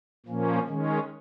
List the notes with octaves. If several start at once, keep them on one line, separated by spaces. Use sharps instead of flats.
A#2 F3 A#3 C#4
D#3 G#3 C#4